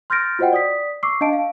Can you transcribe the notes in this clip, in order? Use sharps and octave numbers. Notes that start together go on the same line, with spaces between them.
C6 F6 G6 A6 A#6 D7
F4 F#4 C5 D#5 F#5 G5
D5 D#6 B6
C#6 D6 E6 C7
D4 D#5 F5 A5 D7
F5